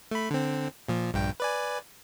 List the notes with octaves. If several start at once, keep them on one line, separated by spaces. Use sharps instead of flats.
A3 B5
D3 C4
A#2 F3
A#1 G2 G5
B4 D5 G#5